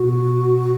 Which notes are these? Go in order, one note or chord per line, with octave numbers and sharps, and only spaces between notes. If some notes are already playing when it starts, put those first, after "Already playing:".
Already playing: B2 F#4